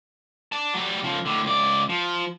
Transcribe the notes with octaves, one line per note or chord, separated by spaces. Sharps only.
D5 A5
F#3 G3
C#3 F3
A2 D3
C#2 D5
F3